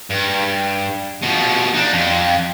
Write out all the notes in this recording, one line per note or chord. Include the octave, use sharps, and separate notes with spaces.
G2
B2 F3
D4 D#4
F2